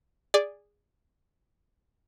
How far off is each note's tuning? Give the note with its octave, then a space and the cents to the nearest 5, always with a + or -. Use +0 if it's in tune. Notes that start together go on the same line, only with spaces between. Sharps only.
G#4 -15 D5 +0